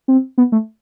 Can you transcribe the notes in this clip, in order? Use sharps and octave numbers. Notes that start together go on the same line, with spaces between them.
C4
B3
A3